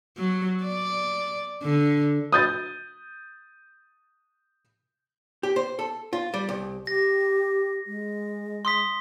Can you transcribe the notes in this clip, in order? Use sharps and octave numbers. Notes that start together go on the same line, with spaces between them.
F#3
D5
D3
D#6 G6 A6
G4
C5
A4
F4
G3
C2
G4 A#6
G#3
C6 D#6 B6